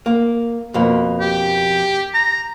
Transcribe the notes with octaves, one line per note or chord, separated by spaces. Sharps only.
A#3
F2 B2 A#3
G4
A#5